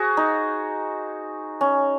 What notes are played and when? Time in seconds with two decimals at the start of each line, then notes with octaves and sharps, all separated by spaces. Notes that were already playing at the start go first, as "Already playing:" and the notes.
Already playing: F#4 G#4 C5
0.17 D#4
1.61 C#4